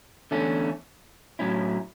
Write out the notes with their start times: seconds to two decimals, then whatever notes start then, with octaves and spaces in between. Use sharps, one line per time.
0.31 E2 D3 A3 C#4
1.39 A2 F#3 C#4 E4